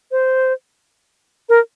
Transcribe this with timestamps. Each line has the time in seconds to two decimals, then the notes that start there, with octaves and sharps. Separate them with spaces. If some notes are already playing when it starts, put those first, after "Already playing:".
0.11 C5
1.49 A#4